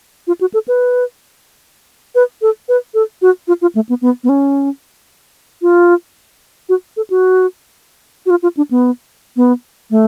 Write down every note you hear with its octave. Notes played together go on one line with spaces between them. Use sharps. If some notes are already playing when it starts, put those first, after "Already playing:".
F4
F#4
A4
B4
B4
A4
B4
A4
F#4
F4
F4
A3
B3
B3
B3
C#4
F4
F#4
A4
F#4
F#4
F4
F4
D4
B3
B3
A3